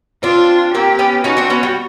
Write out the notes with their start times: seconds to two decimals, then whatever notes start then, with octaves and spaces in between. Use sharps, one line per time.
0.23 C4 D4 F4
0.74 A#3 C4 G4
0.99 B3 C#4
1.24 C#4 D#4 F#4
1.37 C4 D4
1.50 B3 C#4
1.63 G3